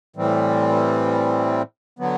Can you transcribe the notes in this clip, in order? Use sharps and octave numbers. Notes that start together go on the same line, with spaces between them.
A2 E3 G3 C4
D3 F#3 B3